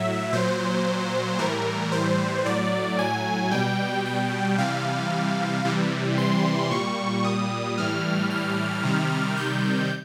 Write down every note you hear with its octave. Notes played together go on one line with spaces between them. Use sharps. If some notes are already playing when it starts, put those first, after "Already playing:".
Already playing: A2 F#3 E5
A#2 F#3 C5
A2 E3 G3 A#4
C5
A2 F#3 D5
G#5
B2 G3 G5
G5
C3 E3 G3 F5
C3 E3 G3
C6
A#2 G3 C#6
D#6
A2 E3 G3 F6
F6
C3 D#3 G3
G6